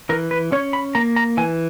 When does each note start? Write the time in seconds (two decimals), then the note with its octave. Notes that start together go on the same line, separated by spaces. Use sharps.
0.09 E3 A#4
0.31 B4
0.52 C#4 C#5
0.73 B5
0.95 A#3 A#5
1.16 A#5
1.37 E3 G#5